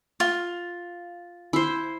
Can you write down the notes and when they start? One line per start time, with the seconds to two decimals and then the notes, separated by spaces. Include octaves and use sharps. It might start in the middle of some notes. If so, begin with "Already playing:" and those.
0.20 F4
1.53 E4 C5